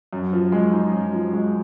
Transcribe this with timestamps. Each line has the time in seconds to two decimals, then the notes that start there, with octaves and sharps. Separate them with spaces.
0.13 F#2
0.33 F3
0.52 G#3
0.73 D#4
0.93 F#2
1.13 F3
1.34 G#3